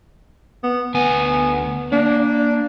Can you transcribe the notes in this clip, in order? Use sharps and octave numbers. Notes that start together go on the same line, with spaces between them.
B3
D2 B3 G#5
A#3 D4